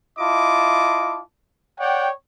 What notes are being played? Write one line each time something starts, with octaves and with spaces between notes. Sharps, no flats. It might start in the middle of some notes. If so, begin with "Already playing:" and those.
E4 F4 D#5 A5 D6
C#5 D5 F#5 G5